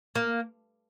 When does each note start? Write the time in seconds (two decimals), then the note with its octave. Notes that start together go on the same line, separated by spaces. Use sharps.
0.15 A#3